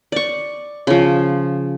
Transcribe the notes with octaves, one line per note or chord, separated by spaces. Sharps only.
D5 C#6
C#3 F3